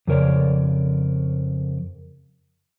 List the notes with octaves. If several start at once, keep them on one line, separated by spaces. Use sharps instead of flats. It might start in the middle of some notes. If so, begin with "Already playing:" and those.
F2 C#3 A#4 C#5 D5